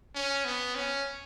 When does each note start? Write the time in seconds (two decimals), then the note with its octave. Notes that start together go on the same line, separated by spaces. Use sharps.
0.15 C#4
0.44 B3
0.75 C#4